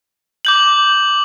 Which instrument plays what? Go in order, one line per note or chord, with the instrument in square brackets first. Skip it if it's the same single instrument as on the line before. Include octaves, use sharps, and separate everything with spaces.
[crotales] D6 G6 F#7